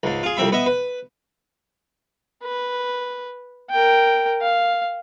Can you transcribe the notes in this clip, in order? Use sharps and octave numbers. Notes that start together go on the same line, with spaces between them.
C#2 G#2
F4 G#4
C2 F2 C4 E5 B5
B3 D#5 E5
B4
B4
A#4 G5
F5